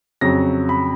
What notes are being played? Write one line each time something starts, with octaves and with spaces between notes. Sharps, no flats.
F2 C#3 F#3 A#6
B5